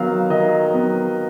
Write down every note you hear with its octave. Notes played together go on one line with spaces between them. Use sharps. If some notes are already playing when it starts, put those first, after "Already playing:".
Already playing: D#3 F#3 B3 F5
D#3 D#5
F#3 B3